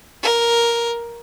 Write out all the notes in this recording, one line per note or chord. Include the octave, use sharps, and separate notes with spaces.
A#4